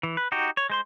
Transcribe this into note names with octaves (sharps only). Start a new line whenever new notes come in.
E3
B4
D#4 F#4 G4
C#5
G#3 C5 C6